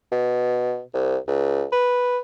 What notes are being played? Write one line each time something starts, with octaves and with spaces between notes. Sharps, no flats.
B2
C2
C#2
B4